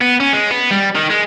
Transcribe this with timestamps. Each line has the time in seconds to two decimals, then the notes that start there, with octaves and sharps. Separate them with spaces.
0.01 B3
0.20 C#4
0.33 G#3
0.51 B3
0.71 G3
0.95 D#3
1.10 G#3